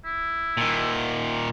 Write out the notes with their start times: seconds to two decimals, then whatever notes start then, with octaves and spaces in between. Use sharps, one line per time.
0.04 E4
0.57 A#2 D#3